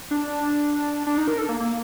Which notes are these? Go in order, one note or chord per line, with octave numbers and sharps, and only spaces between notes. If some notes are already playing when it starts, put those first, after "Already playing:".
D4
D4
D#4
A#4
A4
A#3
A#3